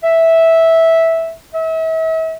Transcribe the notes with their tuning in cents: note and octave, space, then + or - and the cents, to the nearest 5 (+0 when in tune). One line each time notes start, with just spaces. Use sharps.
E5 -10
E5 -40